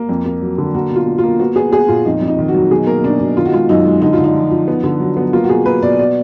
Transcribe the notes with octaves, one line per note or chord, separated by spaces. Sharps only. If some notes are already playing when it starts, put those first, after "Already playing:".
Already playing: A#3
F2
A#3
F#3
D3
A#3 F#4
B2
F4
A#3
F4
A#3
B3 F#4
B3 G#4
B3 G#4
A#2 F4
F2 D#4
F2
D#4
D#3
F#4
F#3
B2 G#4
A#3 A#4
B2 D4
B2
D#3 F4
F#4
G#3 F4
F#2 D#4
G#3
D3 D#4
F4
D3
D#4
F3
F3
B3
D3
F#3
B3
A#3 F4
F#4
B2 G#4
A#3 B4
B2 D5
B3 D5